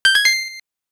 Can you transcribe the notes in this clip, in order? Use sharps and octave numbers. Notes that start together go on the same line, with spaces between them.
G6
G#6
C7